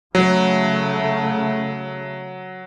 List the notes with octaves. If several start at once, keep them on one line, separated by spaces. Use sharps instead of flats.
C#3 F#3 A3